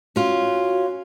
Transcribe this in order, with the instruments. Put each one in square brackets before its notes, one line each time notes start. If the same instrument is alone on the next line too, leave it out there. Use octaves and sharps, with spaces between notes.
[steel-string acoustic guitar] C#4 F4 [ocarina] F#4